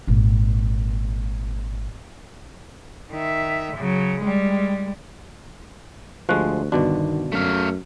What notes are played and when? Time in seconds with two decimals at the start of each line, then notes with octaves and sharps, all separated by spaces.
0.07 G#1 A#2
3.12 D#3 E5
3.76 C#3 F#3
4.20 G3 G#3
6.29 D2 F3 G#3 G4 C5
6.72 G1 B2 D#3 D4 F#4
7.32 F#2 A3 F5